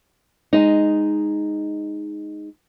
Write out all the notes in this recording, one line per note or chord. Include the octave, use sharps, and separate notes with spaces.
G#3 D#4